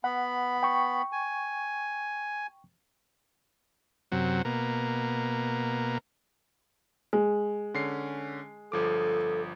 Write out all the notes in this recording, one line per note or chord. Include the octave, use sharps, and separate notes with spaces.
B3 F#5 B5
G5 C#6
G#5
F#2 C3 F#3
B2 A#3
G#3
D3 C#4 C7
G1 F3 A4 D6